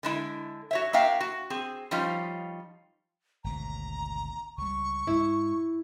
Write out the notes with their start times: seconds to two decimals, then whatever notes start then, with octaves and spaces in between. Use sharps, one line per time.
0.03 D3 G#3 E4
0.71 F#4 C#5 E5
0.93 A#3 F#4 E5 F5 G5
1.20 F#4
1.50 C4 G#4
1.91 F3 G3 C#4 D#4 F4
3.44 G#1 D2 B2 A#5
4.58 C#2 G3 C#6
5.07 G#2 E4